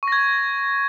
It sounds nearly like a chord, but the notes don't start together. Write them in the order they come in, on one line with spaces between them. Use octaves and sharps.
C#6 A#6 G#6